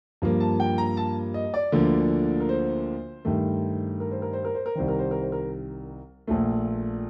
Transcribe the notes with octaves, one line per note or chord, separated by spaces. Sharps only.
G2 F3 A#3
A5
G5
A#5
A5
D#5
D5
D2 D3 F3 A#3
A#4
C5
G2 D#3 A3
A#4
C5
A#4
C5
A#4
C5
A#4
C2 C3 D#3 C5
A#4
C5
A#4
C5
A#4
A#1 A#2 A3